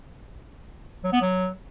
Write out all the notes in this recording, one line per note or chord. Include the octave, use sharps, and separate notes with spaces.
F#3
B3
F#3